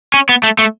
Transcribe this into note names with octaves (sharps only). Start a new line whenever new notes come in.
C#4
B3
A3
A3